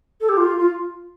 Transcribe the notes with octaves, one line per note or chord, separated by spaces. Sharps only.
A4
G4
F4
F4